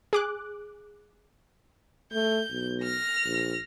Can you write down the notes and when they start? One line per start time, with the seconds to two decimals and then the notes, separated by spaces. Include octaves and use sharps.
0.13 G#4 D6 F#6
2.13 A3 G6
2.51 B1
2.82 F6 A#6
3.25 A#1